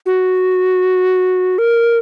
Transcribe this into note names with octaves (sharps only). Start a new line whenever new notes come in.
F#4
A#4